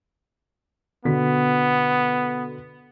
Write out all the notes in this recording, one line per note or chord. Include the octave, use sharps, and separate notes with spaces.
B2 D3 B3 B6